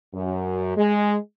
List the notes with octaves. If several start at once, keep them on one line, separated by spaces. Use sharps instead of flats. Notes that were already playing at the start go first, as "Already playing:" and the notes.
F#2
G#3